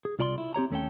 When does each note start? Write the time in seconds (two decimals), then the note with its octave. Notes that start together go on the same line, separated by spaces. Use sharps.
0.05 G#4
0.19 C2 F4 D5 A#5 C6
0.38 E4
0.54 C4 G4 C#5 A#5
0.71 D#2 A3 C#4 G#4 A4 G5